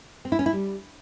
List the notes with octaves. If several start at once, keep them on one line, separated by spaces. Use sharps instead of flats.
C4
E4
C#4
E4
G3